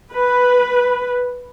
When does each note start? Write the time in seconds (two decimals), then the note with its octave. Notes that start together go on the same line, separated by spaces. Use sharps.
0.13 B4